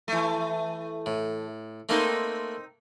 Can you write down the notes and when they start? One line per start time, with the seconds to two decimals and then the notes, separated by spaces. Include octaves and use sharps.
0.08 E3 A3
1.06 A2
1.89 A3 A#3 C4 D#4 B4